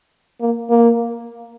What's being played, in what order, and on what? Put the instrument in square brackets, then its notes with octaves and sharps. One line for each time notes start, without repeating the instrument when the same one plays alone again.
[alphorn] A#3
A#3